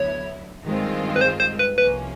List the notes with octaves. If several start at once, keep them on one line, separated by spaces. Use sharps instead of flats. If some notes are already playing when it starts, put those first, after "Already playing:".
Already playing: D2 D3 F#3 B3 E4 C#5
G2 D#3 G#3 C4 F4
B4
C5
C5
B4
C2 C3 F3 A#3 C#4 B4